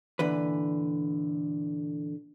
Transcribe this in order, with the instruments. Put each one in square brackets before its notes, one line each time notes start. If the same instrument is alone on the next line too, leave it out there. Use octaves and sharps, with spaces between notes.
[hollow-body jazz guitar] A#2 D3 E3 B4